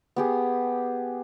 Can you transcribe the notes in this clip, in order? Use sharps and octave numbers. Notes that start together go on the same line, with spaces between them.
B3 G4 G#4